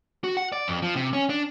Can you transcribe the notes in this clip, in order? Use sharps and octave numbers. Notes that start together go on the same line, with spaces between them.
F#4
F#5
D5
F2
F3
C3
C#4
D4